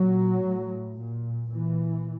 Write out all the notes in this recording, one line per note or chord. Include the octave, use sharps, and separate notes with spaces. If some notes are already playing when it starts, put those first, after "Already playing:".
Already playing: A#2 F#3
A2
A#2
A#2 E3